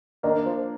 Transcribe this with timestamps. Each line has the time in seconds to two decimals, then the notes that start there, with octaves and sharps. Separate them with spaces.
0.23 D#3 A#3 D4
0.45 F3